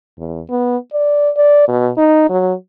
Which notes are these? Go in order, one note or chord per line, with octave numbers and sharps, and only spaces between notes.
E2
B3
D5
D5
B2
D#4
F#3